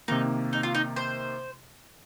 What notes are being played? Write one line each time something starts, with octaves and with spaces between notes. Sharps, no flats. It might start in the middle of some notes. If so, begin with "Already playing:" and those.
C3 D#3 A#3 D#4
D#4
F4
D#4
C5